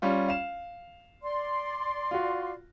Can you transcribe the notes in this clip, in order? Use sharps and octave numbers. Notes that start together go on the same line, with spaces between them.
G3 C#4 F4
F5 E7
D5 C6
F4 F#4